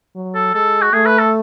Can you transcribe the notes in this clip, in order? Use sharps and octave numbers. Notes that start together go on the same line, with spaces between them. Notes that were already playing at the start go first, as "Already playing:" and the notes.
F#3
A4
G#3 A4
F#4
A3 G#4
B4
A4